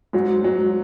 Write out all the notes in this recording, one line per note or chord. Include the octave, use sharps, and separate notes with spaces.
G#2 F#3
G#2 F#3